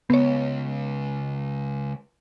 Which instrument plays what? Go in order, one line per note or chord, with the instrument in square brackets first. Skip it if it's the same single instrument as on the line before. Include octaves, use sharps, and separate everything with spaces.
[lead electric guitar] C#2 [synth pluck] B3 C#5